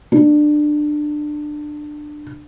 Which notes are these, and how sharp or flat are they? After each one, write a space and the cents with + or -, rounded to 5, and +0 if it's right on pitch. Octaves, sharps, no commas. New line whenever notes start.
D4 +20